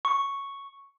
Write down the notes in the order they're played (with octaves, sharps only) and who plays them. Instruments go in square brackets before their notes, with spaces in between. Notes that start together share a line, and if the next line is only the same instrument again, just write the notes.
[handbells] C#6